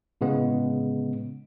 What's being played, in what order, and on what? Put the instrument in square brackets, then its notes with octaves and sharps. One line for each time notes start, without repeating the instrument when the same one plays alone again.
[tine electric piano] A2 C#3 G#3 B3